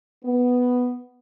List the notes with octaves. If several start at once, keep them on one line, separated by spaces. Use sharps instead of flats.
B3